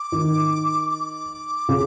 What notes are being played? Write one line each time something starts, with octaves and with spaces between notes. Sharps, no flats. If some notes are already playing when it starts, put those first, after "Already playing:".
Already playing: D6
D#3
D6
C#3